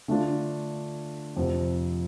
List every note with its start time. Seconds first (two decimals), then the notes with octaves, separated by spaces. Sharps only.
0.08 D3 A3 D4 F4
1.37 F2 C3 F3